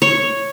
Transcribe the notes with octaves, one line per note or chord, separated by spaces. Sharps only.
C#5